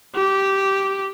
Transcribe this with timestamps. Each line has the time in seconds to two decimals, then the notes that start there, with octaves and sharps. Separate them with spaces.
0.15 G4